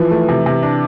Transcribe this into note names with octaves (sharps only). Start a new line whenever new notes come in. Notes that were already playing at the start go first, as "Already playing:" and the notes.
Already playing: E3 F3
A3
C3
C3
D4